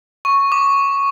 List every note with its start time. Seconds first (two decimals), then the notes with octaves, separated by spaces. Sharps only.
0.25 C#6
0.52 D6